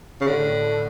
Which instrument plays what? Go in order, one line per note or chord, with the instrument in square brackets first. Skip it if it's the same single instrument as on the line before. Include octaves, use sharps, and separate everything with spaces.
[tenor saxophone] C#3
[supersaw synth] A2 [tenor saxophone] D3